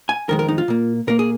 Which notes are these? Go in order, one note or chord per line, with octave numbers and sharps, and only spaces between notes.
G#5
F2 D#3 G#3 A#4
A#4
D#4
F4
A#2 A#3
A#2 A#3 A#4
G#4